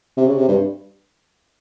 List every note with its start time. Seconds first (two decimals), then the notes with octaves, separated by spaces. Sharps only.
0.17 C3
0.27 C#3
0.37 C3
0.48 G2